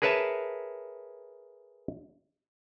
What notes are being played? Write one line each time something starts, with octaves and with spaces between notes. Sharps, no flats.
G#4 A#4 B4 C#5 E5 A5